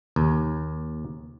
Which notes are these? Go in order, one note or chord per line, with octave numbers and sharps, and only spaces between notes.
D#2